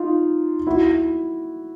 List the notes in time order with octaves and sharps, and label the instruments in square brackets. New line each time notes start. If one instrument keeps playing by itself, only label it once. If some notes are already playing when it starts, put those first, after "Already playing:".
Already playing: [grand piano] D#4 F4
E4 F#4